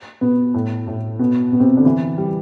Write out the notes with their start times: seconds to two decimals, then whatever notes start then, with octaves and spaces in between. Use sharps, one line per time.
0.21 B2 B3
0.54 A2 A3
0.87 A2 A3
1.19 B2 B3
1.52 B2 B3
1.60 C3 C4
1.77 D3 D4
1.85 E3 E4
2.18 G3 G4